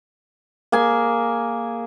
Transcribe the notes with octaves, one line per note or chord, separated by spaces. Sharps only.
A#3 G#4 G#5